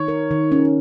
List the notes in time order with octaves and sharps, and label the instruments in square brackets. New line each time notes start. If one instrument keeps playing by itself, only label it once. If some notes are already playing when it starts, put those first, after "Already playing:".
Already playing: [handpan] D#3 [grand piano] C#5
[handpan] A#4
D#3
C#4